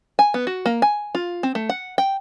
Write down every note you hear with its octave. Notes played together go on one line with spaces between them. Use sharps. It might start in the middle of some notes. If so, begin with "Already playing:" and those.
G#5
B3
F#4
A#3
G#5
F4
C4
A3
F#5
G5